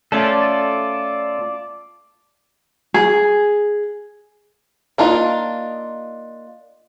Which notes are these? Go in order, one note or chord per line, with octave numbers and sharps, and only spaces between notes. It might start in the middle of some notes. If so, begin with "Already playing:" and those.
A3 C#4 F4 A4 D5
G#4
A#3 D4 D#4 F4